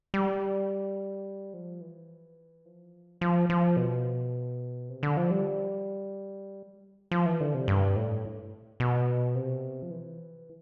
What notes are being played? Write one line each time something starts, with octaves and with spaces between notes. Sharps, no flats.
G3
F3
E3
F3
F3
F3
B2
C3
D3
F3
G3
F3
E3
D3
C3
G2
A2
B2
C3
F3
E3